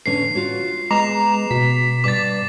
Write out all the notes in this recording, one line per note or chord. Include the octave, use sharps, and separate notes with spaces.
E2 D3 C#4 C7
F4 F#4 C#5
G#3 B3 A#5 D6 C7 F7
B2 B6
G2 D5 D6 A6